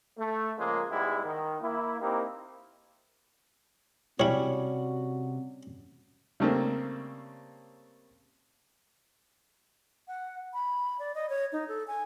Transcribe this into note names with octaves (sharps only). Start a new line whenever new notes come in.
A3
C#3 F3 G#3 A#3
G#2 G3 G#3 B3 E4
D#3
A#3 E4
A#3 C4 D#4 E4 G4
C3 G3 C#4 E4 F#4 C#5
C#3 G3 A3 A#3 C4
F#5
B5
D5
D#5
C#5
D#4
A4
G#5